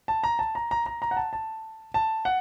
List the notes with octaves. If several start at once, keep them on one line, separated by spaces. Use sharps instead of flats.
A5
A#5
A5
A#5
A#5
A#5
A#5
F#5
A5
A5
A5
F#5